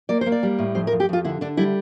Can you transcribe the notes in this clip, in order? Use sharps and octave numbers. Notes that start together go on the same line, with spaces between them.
A#3 D5
C5
A#3
D5
G3
A2
F2 C5
A#4
F2
G4
F2 F4
D3 E4
D3 D4
G3 E4